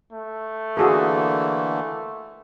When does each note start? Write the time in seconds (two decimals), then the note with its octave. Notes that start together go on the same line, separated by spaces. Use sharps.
0.12 A3
0.77 D3 E3 A#3 F#4 G#4 A4